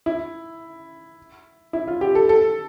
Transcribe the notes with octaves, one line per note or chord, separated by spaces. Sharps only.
E4
E4
F4
G4
A4
A4